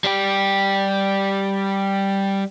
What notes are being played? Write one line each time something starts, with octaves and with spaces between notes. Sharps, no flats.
G3 G4